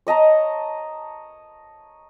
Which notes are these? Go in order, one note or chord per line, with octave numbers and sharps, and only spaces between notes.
C#5 D#5 A5 A#5